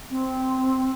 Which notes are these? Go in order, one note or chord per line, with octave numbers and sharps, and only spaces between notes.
C4